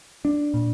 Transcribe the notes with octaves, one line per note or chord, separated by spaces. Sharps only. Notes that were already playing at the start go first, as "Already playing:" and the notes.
D4
A#2